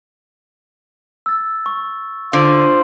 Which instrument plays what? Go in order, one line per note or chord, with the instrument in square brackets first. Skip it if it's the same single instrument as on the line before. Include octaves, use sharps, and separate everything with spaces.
[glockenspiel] E6 A6
C#6
[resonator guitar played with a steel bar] D3 [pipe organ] F4 C5 [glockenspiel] D6 D7 F#7